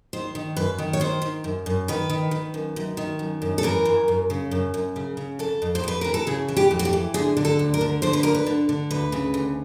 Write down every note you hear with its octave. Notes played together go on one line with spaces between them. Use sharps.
D#3 C5
D#3
F#2 B4
D#3
C#5
D#3 C5
D#3
F#2
F#2
D#3 B4
D#3
D#3
F#2
F#2
D#3
F#2
F#2
A4
E3 A#4
F#2
F#2
C#3
F#2
F#2
C#3
C#3
F2 A4
F2
C5
F2 B4
E3 A#4
A4
C#3 G#4
E3
G4
F2
F#4
G4
E3
D3 G#4
D3
A4
D2
A#4
D3
D3 C5
B4
D2 A#4
B4
D3
D3
D2 B4
C#3
D2